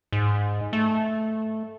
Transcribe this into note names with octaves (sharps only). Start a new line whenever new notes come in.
G#2
A3